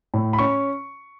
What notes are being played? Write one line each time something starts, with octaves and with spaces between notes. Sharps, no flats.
A2
B5
C#4 C#6